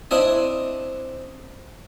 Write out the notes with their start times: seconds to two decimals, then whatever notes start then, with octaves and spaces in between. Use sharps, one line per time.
0.11 C4 D4 E4 D#5 G#5